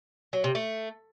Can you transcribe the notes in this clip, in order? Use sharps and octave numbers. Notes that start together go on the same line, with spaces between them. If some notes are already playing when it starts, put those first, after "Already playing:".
F#3
C3
A3